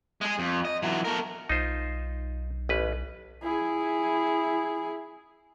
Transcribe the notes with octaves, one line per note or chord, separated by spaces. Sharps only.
G#3 G#4
F2
D#5
E3 F#3
A3 A#4
B1 D#4 F4 C5
A1 B4
E4 G#4